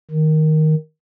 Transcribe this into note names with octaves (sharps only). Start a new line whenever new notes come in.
D#3